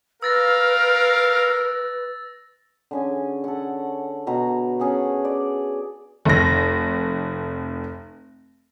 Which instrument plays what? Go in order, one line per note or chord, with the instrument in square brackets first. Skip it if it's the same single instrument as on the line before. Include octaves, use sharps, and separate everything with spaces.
[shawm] A#4 [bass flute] B4 [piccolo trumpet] F5 [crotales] E6 A6 A#6
[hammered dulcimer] D3 C#4 G#4
A4 F#5
B2 F#4 A#5
C#4 G#4 A4 F#5
D5
[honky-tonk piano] F1 A#6